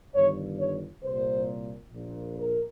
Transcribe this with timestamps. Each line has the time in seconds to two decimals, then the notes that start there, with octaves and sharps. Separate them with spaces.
0.14 G1 G2 D#3 C#5
0.59 C#5
1.03 C2 A#2 C5
1.91 A#1 A#2
2.36 A#4